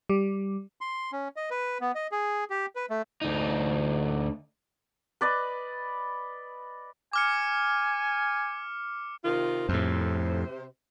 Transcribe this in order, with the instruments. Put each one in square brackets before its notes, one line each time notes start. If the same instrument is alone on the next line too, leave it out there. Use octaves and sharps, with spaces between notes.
[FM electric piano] G3
[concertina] C6
C#4
D#5
B4
B3
D#5
G#4
G4
B4
A3
[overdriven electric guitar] D2 D#4
[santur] B4 D5 D#5
[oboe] G#5 [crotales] D6 F6 C#7
[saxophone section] C3 D#3 F4
[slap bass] F2 A2 [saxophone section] C3 C5